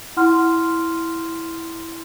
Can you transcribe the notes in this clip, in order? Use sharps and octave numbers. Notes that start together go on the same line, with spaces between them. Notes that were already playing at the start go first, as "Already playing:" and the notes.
E4 F#5 C6 F6